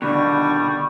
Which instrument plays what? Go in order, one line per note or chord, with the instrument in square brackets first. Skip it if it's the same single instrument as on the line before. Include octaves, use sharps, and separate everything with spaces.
[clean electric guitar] B2 D#3 [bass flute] D3 [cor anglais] G3 [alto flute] C#6